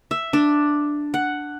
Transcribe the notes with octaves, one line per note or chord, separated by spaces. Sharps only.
E5
D4
F#5